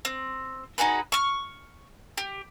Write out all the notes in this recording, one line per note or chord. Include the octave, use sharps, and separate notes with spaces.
C4
D#4 F#4 G#4 B4
C#6 F6
G4